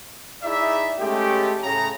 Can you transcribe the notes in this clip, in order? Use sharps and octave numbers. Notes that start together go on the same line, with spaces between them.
D#4 E4 G#4 D5 E5
G#3 A3 C#4 G4
A2 C#3 A#5